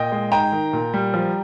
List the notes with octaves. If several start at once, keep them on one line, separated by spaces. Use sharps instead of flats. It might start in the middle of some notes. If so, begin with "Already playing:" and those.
Already playing: A#2 D#5 G5
G#3
G#2 G5 A#5
D#3
A#2
G3
F3